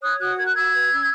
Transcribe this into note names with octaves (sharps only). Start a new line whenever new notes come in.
C#5 D#6 F#6
F#4 D#6 F#6
A#4 G#6
F#6
F#4 E6 G#6
B4
C#4